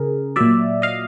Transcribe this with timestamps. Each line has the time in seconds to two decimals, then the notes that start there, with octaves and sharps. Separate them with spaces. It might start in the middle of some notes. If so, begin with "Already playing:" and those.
Already playing: C#3 G#4 A#4
0.36 A#2 F#3 D5 E5
0.82 D#5 F5